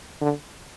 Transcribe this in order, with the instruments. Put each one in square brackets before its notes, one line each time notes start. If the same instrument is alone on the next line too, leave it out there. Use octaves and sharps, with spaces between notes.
[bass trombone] D3